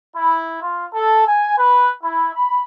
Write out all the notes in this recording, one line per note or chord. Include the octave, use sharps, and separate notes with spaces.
E4
F4
A4
G#5
B4
E4
B5